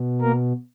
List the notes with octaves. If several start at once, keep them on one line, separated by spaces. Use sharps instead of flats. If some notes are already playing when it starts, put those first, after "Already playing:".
Already playing: B2
A#3 A#4